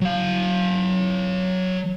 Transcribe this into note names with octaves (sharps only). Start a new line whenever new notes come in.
F#3 F5